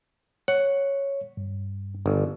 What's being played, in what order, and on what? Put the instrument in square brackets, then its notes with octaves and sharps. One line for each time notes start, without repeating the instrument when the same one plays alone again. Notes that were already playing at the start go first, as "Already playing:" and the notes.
[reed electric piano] C#5 [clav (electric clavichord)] F#5
[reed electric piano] G2
[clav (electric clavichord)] G1